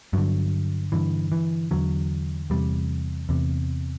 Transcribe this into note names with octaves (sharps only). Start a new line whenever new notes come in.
G2 D3 F#3
G2 D3 E3
E3
E2 D3 F#3
E2 C3 G3
E2 C3